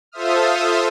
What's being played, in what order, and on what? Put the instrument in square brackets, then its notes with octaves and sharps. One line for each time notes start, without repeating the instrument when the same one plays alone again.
[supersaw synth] F4 A4 C5 E5 D#6 F6